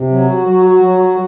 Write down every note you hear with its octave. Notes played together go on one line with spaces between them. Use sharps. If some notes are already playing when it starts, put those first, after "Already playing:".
Already playing: C3
F#3
F#4
F#3
F#4
F#3
F#4